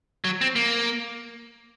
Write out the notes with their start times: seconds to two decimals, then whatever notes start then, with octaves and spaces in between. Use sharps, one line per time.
0.25 F#3
0.41 C4
0.56 A#3